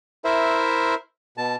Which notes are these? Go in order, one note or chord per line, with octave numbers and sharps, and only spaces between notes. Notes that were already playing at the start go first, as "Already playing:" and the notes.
E4 A#4 C5 E5
B2 A5